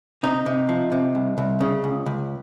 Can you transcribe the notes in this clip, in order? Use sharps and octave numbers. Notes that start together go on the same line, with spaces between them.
C3 D#4
C3
F3
C3
C2
C2
C#3
C#2
C#2